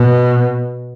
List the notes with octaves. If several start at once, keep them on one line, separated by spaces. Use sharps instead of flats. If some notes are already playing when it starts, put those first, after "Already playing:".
Already playing: B2